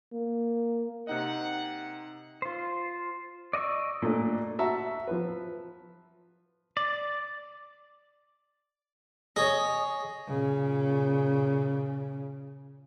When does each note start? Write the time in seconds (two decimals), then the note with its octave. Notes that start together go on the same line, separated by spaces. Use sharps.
0.14 A#3
1.07 C3 D#4 D#5 F#5
2.42 F4 C5
3.53 D5 D#5 F5 C#6 E6
4.02 A#2 A3 D4
4.59 F#4 E5 A5 A#5
5.07 F3 B4
6.77 D5
9.36 G#4 C#5 D#5
10.27 A#2 C#3